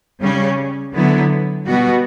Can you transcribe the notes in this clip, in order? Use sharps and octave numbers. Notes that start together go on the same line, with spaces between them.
C#3 G3 C#4
D3 F#3 B3 E4
B2 G3 B3 F#4